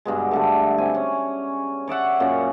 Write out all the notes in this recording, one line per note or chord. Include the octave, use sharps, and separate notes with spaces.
G2 B2 G#3
G2 D3 A3
C4 G#5
C#4
C#5 D5 E5 F#5
F#2 A#2 C#4